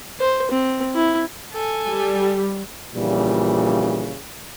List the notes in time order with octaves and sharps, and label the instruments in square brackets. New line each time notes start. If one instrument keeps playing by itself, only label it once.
[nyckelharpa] C5
C4
E4
[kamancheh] A4 G#5
[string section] G3
[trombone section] A#1 A#2 C#3 E3 G3